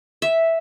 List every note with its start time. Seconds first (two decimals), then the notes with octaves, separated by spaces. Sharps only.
0.22 E5